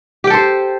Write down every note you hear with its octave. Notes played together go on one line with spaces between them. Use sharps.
G4 A4 C5 G5